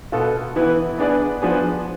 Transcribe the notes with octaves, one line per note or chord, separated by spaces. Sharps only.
B2 B3 F4 A4
E3 B3 E4 B4
B3 D4 G#4 B4 D5
F3 B3 D4 G#4 B4